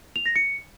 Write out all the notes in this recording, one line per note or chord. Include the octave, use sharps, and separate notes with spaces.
F7
A#6
C#7